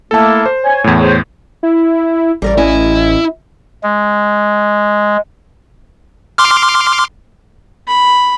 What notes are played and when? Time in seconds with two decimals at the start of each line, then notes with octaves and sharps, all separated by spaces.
0.11 A3 A#3 E4 A4 A5
0.46 C5
0.64 C#5 G#5
0.84 E2 A2
1.00 G#4 C5 C#5
1.63 E4
2.42 A1 G3 A#4 D5
2.58 C#4 E4 D#5
3.83 G#3
6.38 C6 D6 F6
7.88 B5